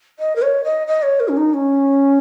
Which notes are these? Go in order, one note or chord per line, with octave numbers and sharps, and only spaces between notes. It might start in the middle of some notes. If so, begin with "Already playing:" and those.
D#5
A#4
C#5
D#5
D#5
C#5
A#4
C#4
D#4
C#4